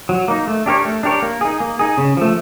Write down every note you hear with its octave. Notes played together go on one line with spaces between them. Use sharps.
F#3
A#3 D#4
A3
D4 G4 A#4 C#5
A3
D4 G4 A#4 C#5
A#3
D#4 G#4
A#3
D#4 G#4
C#3
F3 A3